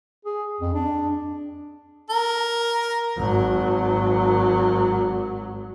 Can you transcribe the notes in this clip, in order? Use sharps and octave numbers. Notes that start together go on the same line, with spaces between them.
G#4
F2
D4
A#4
G#1 F#3